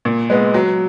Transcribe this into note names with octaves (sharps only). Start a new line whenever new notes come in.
A#2
G#3 B3
F#3